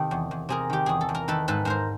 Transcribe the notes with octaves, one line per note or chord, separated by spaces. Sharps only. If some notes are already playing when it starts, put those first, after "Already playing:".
Already playing: C3 D#3 G4 A4
E2
E2
C3 G#4 A#4
D#3 G4
E2 G#4
A4
E2
A#4
D#3 A4 B4
G#2 A4 B4
G#2 A#4 C5